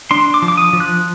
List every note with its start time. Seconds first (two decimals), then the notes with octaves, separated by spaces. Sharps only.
0.11 D4 C6
0.34 D6
0.42 F3
0.48 D6
0.57 D#6
0.73 F3
0.80 F#6